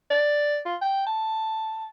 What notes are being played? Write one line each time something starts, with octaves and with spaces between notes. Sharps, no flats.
D5
F4
G5
A5